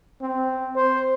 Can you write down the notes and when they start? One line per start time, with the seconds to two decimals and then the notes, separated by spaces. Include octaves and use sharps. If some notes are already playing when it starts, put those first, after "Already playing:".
0.21 C4
0.76 C5